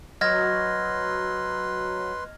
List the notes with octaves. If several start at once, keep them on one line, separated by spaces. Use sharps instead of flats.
F#3 B4 D#5 C6 F6 G#6 A#6